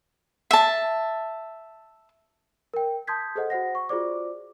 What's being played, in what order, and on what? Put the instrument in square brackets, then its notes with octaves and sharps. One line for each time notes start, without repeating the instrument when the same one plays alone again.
[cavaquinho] E5 A5
[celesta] A#4 G5
A5 C6 D#6 G6 G#6 B6
G#4 A4 C5 D#5 F#5
F#4 C5 F#5 A#6
C#6
F4 F#4 G#4 C5 D5 D6